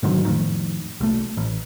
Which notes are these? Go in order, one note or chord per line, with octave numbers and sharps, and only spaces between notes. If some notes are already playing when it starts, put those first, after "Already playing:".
G#2 D3 D#3 F#3
F2 A2 D#3
C2 A3
A1